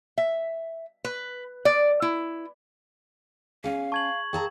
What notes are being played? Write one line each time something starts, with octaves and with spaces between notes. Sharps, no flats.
E5
B4
D5
E4
C#4 G#4 F5 G#5
A5 C#6 G#6 F#7
G#4 A#4 F5 G5 A5 A#5